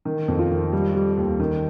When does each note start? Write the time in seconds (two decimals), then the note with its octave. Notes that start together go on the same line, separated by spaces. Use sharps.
0.05 D#3
0.28 F2
0.39 F4
0.51 D#3
0.72 G3
0.95 G3
1.17 D#2
1.40 D#3